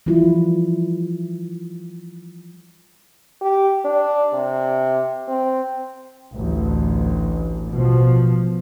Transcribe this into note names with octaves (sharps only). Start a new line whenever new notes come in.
E3 F3 G3 E4 F4
G4
D4
C3
C4
A1 D2
B2 F3